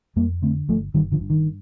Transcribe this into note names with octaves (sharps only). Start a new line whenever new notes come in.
F2 G3 A#3
D3 A3 C4
G1 F3 A3
G1 D#3 G3
D3 F3
G2
D#3